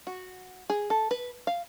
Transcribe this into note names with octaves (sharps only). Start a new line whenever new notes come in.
F#4
G#4
A4
B4
F5